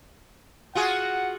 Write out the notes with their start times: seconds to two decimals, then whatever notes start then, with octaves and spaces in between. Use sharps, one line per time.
0.75 F4 F#4 G#4 F#5